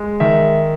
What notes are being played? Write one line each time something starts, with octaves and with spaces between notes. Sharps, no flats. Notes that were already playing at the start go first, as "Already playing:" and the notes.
Already playing: G#3
D#3 E5